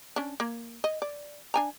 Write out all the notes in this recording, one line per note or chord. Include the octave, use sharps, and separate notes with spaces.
C#4 D4
A#3
D#5
D5
D4 G#5 A#5